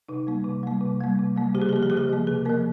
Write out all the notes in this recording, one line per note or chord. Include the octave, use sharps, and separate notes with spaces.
C3 D#4
G3 A#3
C3
G3 A#3
C3
G3 A#3
C3
G3 A#3
C#3 G4
G#4
G4
F3 A#3 G#4
G4
C#3 G#4
G4
F3 A#3
C3 G#4
F3 A#3 A#4